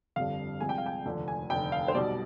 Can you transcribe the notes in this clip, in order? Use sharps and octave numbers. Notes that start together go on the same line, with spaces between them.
G1 F2 D3 G3 F5
C2 C3 F3 G#3 G#5
G5
F5
G5
F1 D#2 D3 F3
G#5
F1 D#2 D3 G5
F5
C5
B1 B2 G3 D5